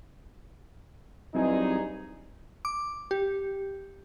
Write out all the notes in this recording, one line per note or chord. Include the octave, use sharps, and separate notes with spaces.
G2 F#3 C4 D#4 E4 G#4
D6
G4